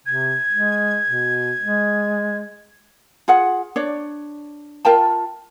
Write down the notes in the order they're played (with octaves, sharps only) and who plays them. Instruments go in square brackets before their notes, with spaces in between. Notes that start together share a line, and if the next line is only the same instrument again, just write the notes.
[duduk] C3 [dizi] G#6
[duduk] G#3
B2
G#3
[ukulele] F4 G#4 F#5
D4 C#5 D5
F4 A#4 G5 A5